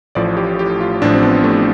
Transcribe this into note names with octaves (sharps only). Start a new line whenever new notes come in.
A1 A2 F3 D5
G4
G4
F4
A1 A2 F3 D4
C4
B3
A3